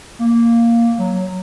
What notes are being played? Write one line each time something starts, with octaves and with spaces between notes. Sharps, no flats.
A#3
F#3